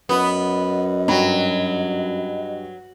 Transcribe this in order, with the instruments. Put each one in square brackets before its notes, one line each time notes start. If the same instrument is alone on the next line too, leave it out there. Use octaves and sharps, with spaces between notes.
[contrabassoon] F#2 [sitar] B3 [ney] D#5
[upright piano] G2 G5 B5 [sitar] F#3